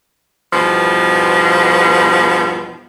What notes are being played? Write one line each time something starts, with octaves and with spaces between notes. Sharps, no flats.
E2 G2 B2 F3